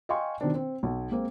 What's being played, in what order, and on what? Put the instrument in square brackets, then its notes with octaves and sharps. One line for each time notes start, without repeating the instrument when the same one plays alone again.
[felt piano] D#5 F5 G5 G#5 C6 C#6
B2 D#3 C4 D4
C4
B1
G#3 A#3 C4